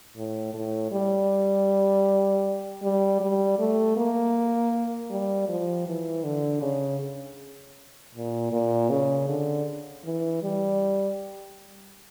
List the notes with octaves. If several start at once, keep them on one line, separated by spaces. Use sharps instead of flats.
A2
A2
G3
G3
G3
A3
A#3
G3
F3
E3
D3
C#3
A#2
A#2
C#3
D3
E3
G3